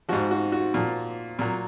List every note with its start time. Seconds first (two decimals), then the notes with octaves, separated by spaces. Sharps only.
0.09 G#2 F3 F#4
0.31 F#4
0.52 F#4
0.74 A#2 F3
1.39 A#2 F#3